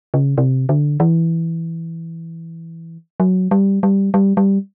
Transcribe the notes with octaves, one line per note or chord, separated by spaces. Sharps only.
C#3
C3
D3
E3
F#3
G3
G3
G3
G3